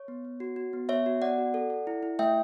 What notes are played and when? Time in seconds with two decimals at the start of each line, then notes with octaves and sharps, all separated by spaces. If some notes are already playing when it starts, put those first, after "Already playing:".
Already playing: C#5
0.08 B3
0.25 B3
0.40 F#4
0.56 F#4
0.73 B3
0.89 B3 C#5 E5
1.06 F#4
1.22 B3 D5 F#5
1.38 F#4
1.54 A4
1.70 A4
1.87 E4
2.03 E4
2.19 A3 E5 G5